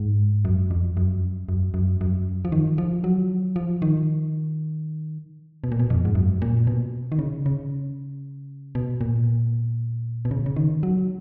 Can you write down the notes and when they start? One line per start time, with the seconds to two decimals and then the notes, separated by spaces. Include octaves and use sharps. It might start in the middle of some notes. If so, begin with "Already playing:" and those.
Already playing: G#2
0.45 F#2
0.71 F2
0.97 F#2
1.49 F#2
1.74 F#2
2.01 F#2
2.45 F3
2.52 D#3
2.78 F3
3.04 F#3
3.56 F3
3.82 D#3
5.64 B2
5.72 A#2
5.80 B2
5.90 F2
6.05 G#2
6.15 F#2
6.42 A#2
6.67 B2
7.12 D#3
7.19 C#3
7.46 C#3
8.75 B2
9.01 A#2
10.25 B2
10.31 C#3
10.46 C#3
10.56 D#3
10.83 F#3